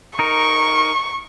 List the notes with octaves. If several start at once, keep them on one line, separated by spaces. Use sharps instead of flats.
D#4 A#4 C#6